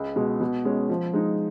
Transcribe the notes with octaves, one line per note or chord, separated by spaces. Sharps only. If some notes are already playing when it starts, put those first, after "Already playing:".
Already playing: C#2
B2 G#3
B2
G#3 C#4
F3
G#3 D#4